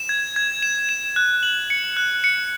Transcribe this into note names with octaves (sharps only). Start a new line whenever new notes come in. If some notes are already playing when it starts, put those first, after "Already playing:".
Already playing: E7
G#6
G#6
E7
E7
F#6
F#7
C#7
F#6
C#7